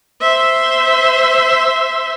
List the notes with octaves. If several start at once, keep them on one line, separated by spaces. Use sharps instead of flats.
C5 E5